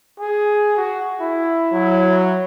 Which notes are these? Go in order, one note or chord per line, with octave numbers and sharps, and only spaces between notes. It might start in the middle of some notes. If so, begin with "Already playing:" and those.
G#4
F#4
E4
F#3